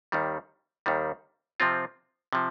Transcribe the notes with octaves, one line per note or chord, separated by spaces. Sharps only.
D#2 D#3 G3
D#2 D#3 G3
C3 F3 C4 F4
C3 F3